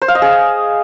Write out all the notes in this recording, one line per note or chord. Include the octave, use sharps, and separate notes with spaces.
C5
F5
D#5
G#4